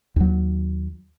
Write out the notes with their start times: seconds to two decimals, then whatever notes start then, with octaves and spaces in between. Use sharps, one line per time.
0.16 D#2 F#3